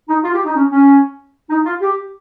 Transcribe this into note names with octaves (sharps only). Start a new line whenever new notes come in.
D#4
F4
G4
D#4
C#4
C#4
D#4
F4
G4